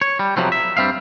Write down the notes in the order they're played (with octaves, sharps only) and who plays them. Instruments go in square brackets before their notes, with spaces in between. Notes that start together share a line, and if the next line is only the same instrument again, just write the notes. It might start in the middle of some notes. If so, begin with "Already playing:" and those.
[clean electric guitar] C#5
G3
F2 C3 F3 F#3 B3 C4
E5
G2 G3 C4 E5 F5